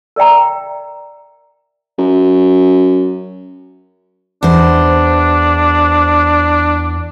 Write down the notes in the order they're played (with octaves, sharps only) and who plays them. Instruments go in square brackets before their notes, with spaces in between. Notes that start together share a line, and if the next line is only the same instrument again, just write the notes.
[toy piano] A#4 D5 E5 G5 A#5
[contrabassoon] F#2
[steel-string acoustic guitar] E2 C5 [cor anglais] D4